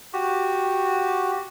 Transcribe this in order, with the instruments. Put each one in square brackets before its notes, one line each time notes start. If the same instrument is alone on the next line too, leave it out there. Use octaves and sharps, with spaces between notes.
[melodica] F#4 G4